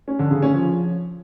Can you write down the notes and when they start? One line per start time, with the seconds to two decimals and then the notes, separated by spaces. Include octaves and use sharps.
0.08 C#4
0.19 D3
0.31 C#3
0.42 C#4
0.54 F3